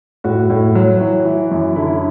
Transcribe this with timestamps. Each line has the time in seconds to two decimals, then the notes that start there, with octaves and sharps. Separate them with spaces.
0.24 A2 F#4
0.50 A2
0.75 F#3
1.01 E3
1.25 E3
1.51 F#2
1.76 D3 E4